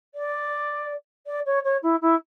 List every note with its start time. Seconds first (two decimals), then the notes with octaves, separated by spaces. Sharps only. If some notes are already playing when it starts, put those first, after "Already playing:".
0.14 D5
1.26 D5
1.45 C#5
1.64 C#5
1.82 E4
2.01 E4